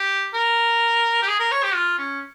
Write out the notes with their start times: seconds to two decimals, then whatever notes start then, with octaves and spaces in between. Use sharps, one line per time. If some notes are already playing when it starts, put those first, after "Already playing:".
Already playing: G4
0.34 A#4
1.22 G4
1.28 G#4
1.39 A#4
1.51 C#5
1.63 G4
1.75 F4
1.98 C#4